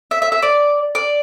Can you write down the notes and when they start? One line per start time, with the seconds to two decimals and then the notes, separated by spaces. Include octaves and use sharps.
0.11 E5
0.22 E5
0.32 E5
0.42 D5
0.95 D5